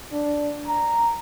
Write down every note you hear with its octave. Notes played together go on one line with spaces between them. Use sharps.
D4
A#5